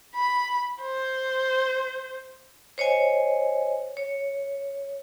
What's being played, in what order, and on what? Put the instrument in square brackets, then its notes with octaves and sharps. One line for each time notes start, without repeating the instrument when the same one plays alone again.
[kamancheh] B5
C5
[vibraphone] C5 C#5 D#5 G#5
C#5